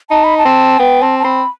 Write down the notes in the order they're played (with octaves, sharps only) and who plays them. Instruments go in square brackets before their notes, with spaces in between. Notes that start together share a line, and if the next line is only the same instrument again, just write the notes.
[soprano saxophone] D#4 [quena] A5
[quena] B5
A5
[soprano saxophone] C4
[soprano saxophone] B3 [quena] G5
[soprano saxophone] C4 [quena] A5
[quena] A5
[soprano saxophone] C4 [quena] B5